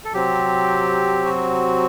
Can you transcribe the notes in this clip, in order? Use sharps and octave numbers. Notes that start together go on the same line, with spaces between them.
A4
C3 F#3 C4 G4
F#4